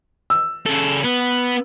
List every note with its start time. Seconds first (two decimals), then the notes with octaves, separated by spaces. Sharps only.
0.30 E6
0.66 C#3 A4
1.04 B3